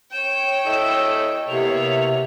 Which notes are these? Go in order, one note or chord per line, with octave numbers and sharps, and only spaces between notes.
C#5 G5 E7
E4 A4 D#5
C3 A#3 B3 E4 C#5 F7